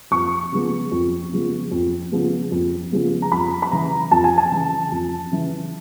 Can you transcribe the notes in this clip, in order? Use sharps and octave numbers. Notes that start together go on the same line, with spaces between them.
F2 C#6
C#3 F3 G#3 B3
F2
C#3 F3 G#3 B3
F2
C#3 F3 G#3 B3
F2
C#3 F3 G#3 B3
A#5
F2 B5
B5
C#3 E3 A#5
F2 A5
G#5
A5
C#3 E3
F2
C#3 E3